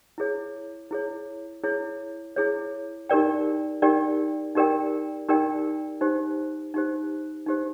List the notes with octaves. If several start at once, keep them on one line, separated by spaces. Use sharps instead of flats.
E4 G#4 C#5
E4 G#4 C#5
E4 G#4 C#5
E4 G#4 C#5
D#4 G4 A#4 D5 G5
D#4 G4 A#4 D5 G5
D#4 G4 A#4 D5 G5
D#4 G4 A#4 D5 G5
D#4 G4 C5
D#4 G4 C5
D#4 G4 C5